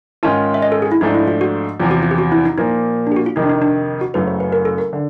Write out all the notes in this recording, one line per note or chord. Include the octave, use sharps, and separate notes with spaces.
G#2 D#3 G#3 C#4 F4 A5
E5
D#5
A4
G#4
E4
G#2 F3 A3 D4 D#4
E4
F4
F#4
E2 C3 F3 F4
F#4
F4
G4
F#4
E4
D#4
A#2 F3 A#3 D#4
D4
G4
F#4
F4
F2 C3 D#3 D#4
D4
D#4
D4
F#4
F#1 F#2 C#3 F#3 A3 B4
C5
B4
A#4
A4
A#4
D3